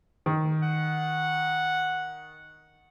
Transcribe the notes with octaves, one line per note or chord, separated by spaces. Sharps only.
D#3
F#5